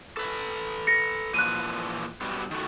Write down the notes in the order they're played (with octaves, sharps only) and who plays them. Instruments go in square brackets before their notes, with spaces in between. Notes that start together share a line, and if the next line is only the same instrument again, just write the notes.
[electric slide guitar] A4 B4
[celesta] A#6 C#7
[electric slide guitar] A#2 E3 F3 [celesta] F#6 D#7
[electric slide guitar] B2 F#3 G3
D#3 A3 F#4